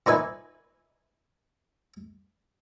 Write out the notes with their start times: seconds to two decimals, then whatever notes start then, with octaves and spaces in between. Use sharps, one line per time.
0.06 A#2 D#4 B4 E5 G#5